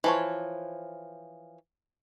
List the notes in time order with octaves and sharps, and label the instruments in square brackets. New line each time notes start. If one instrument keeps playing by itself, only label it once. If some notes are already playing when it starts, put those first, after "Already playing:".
[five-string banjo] E3 F3 C#5